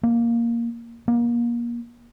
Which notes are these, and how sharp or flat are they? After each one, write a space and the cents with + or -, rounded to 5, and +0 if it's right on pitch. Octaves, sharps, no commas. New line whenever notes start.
A#3 +5
A#3 +30